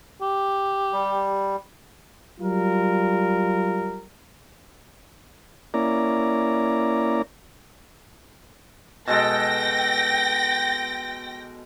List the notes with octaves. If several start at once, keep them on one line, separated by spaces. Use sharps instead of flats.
G4
G3
F#3 G3 F4 A#4
A#3 C#4 E4 D5 A#5
B2 G#3 A4 G5 A#6